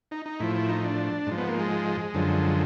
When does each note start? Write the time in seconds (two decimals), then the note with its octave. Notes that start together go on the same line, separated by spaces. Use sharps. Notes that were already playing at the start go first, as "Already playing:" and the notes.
0.11 D#4
0.26 D#4
0.40 A2 F3 E4
0.55 E4
0.69 D#4
0.84 D4
1.27 G#2 F3
1.38 B3
1.49 A#3
1.59 G#3
2.14 F#2 D3 F3